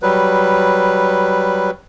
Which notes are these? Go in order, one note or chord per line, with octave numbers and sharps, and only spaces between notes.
F#3 G3 B4